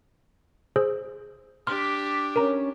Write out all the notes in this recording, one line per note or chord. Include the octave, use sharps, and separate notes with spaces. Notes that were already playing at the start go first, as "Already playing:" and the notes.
G#4 C5 E6
D4 G4 C6 F6 B6
C#4 A#4 A#5